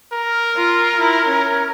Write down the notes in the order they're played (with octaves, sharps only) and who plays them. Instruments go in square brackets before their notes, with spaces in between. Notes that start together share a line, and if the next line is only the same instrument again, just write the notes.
[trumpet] A#4
[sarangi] F4
E4
C#4